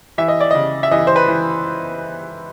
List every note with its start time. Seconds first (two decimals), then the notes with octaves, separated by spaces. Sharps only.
0.18 E3 E5
0.28 D#5
0.40 D5
0.51 C#3 D#5
0.83 E5
0.91 E3 D#5
1.07 C5
1.16 B4
1.28 E3